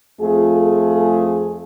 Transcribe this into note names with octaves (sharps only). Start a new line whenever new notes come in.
F2 A3 F4 G#4